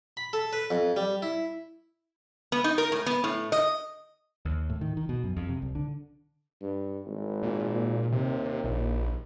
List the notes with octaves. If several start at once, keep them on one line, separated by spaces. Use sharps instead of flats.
B5
A4
B4
F2
G3
E4
B3
D#4
A#4
A2
B3
A2
D#5
D#2
A2
D#3
D#3
B2
F#2
F2
C3
C2
D3
G2
G#1
A#2
D#2 C3
A#1